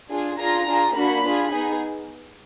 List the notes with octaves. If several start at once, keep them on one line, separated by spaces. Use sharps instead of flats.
D4 F4 G#4
D4 F4 G#4 A#5
D4 F4 G#4
A#3 D4 F#4 B5
D4 F4 G#4
B3 D#4 G#4